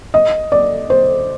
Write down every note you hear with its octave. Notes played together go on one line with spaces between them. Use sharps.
D#5
D5
C5